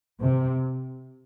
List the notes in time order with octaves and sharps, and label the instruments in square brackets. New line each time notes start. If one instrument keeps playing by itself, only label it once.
[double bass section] C3